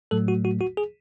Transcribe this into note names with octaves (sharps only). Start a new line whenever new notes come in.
A2 F#3 A3 A4
F#4
F#4
F#4
G#4